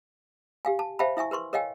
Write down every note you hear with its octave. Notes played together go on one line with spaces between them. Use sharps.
G4 F5 G#5
A5
C5 E5 F5 G5 A5 B5
E4 E5 G#5 C#6
A#4 B4 C6 C#6
A#4 C#5 D#5 F5 G5 G#5